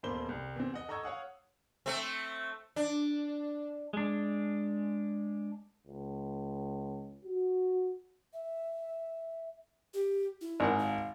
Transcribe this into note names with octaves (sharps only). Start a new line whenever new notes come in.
D#1 E2 A#3 C5 B5 G7
C2
E2 C4
D#5 F#5
A4 D#5 A#5 C#6 E6 G#6
C#5 F5 F#5 D#6
A3 C4
D4
G#3 D4
C#2
F#4
E5
G4
E4
G#1 A#4 F#5
F5